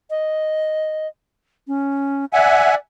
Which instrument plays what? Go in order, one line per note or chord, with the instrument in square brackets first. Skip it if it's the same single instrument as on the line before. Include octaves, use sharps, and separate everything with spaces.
[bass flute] D#5
C#4
[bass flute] D5 [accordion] E5 F#5 G#5